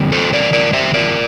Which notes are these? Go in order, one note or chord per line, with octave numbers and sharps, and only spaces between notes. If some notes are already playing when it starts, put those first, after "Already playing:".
Already playing: E2 D3 G3 C4
A4 C5
A#4 D5
A#4 D5
C5 E5
A#4 D5